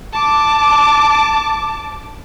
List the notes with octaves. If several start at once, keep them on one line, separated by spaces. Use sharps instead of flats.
A5 D6